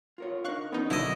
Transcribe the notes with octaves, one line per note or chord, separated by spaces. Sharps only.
F4 A#4 C#5
D4 D#4 A#4 F5 C#6 F#6
E2 B3 C#4 D#4 A#4
B2 D3 F#3 E4 D#5